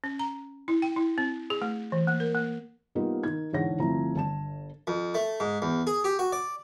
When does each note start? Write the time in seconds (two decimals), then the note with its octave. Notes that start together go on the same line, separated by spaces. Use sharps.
0.04 C#4
0.19 A#5
0.68 E4
0.82 G5
0.96 E4
1.18 C4
1.50 G#4
1.62 A3
1.92 E3
2.07 A#3
2.20 A#4
2.35 A#3
2.95 G3 A#3 B3 D#4 F4
3.23 D#3 G#6
3.53 E2 G#2 D3 C#5 F#5 A#6
3.79 G1 F3 A3 C4 E4 A#5
4.16 G1 A5 E7
4.87 F2
5.14 A3
5.40 G#2
5.62 E2
5.87 G#4
6.04 G4
6.19 F#4
6.32 D5